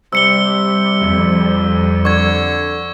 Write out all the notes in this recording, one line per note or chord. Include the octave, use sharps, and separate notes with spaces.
C3 G3 E6 C#7 G7
F2
D3 C#6 G#6